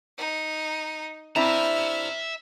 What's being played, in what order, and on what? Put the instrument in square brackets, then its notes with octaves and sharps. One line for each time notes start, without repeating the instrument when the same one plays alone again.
[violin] D#4
[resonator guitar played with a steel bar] C4 D4 E4 [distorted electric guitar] E5 A#5 [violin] E6 F6